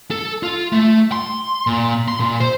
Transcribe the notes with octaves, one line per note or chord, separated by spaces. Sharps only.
A4
F4
A3
C6
A#2
C6
A#2
C5